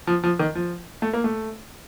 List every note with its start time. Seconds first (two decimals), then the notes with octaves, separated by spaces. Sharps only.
0.07 F3
0.24 F3
0.39 D#3
0.55 F3
1.02 A3
1.13 A#3
1.24 A3